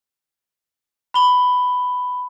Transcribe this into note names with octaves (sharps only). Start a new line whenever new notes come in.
B5 G7